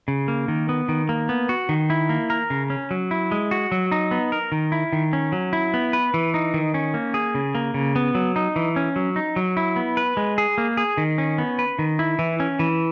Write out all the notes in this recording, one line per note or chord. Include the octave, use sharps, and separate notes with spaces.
C#3
A#3
D#3
B3
D#3
A#3
B3
F#4
D#3
E4
A#3
A#4
C#3
C#4
F#3
E4
G#3
F#4
F#3
D#4
B3
A#4
D#3
E4
D#3
C#4
F#3
E4
B3
B4
E3
D#4
D#3
C#4
A#3
G#4
C#3
A#3
C#3
B3
F#3
D#4
E3
C#4
F#3
D#4
F#3
E4
B3
B4
G#3
G#4
A#3
G#4
D#3
C#4
B3
B4
D#3
E4
E3
C#4
E3